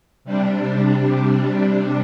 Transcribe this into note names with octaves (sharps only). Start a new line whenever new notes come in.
C3 G3 D4